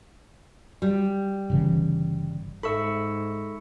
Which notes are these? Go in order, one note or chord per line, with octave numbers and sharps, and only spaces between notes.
G3
G1 C#3 E3
G#2 A4 E5 B5 C#6 E6 C#7